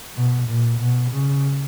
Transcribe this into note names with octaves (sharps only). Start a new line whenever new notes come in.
B2
A#2
B2
C#3